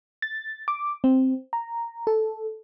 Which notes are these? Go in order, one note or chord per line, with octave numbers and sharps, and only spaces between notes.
A6
D6
C4
A#5
A4